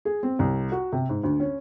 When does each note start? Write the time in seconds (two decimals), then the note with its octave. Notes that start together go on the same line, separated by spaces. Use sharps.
0.05 G#4
0.23 C4
0.39 C2
0.72 F#4
0.92 C3
1.09 G#2
1.24 D2
1.40 C#4